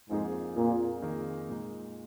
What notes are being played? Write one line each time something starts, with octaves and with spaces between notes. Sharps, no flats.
F2 G#2 F3 A#3 D#4 G#4
F2 A#2 F3 A#3 G#4
F2 D#3 A#3 G#4
A#2 G#3 D#4